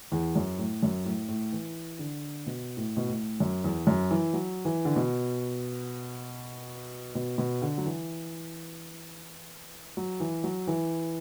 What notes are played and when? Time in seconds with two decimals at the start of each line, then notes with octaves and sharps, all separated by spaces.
0.12 E2
0.36 F#2
0.58 A2
0.83 F#2
1.05 A2
1.28 A2
1.52 E3
1.99 D3
2.46 B2
2.77 A2
2.97 B2
3.08 A2
3.40 F#2
3.64 E2
3.87 F#2
4.11 E3
4.33 F#3
4.65 E3
4.85 D3
4.96 B2
7.15 B2
7.38 B2
7.62 D3
7.78 F#3
7.86 E3
9.97 F#3
10.20 E3
10.44 F#3
10.67 E3